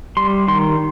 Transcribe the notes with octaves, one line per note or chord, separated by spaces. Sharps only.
G3 C6
D#3 C6